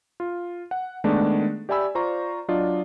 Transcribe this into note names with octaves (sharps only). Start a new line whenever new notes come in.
F4
F#5
D#3 G#3 A3 B3 D4 D5
G4 D5 E5 G#5 B5 E6
F4 C5 D5 A#5 C#6
F#3 D4 F4 D5 D#5